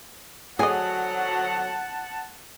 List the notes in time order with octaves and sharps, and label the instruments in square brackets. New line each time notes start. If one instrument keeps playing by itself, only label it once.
[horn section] D3 F3 F#3 [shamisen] G#4 D#5 [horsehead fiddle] F#5 A5 [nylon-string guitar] G#5